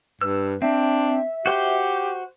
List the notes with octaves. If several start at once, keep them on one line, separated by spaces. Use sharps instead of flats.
G2 B4 E6
C4 D4 E5
F#4 G4 C5 C6